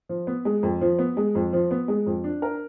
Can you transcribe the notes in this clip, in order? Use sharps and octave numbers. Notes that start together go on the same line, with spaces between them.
F3
B3
G#3
F2
F3
B3
G#3
F2
F3
B3
G#3
F2
D4
A#4